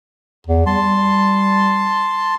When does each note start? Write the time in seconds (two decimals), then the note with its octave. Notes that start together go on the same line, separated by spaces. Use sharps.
0.47 E2
0.66 G3 A5 C6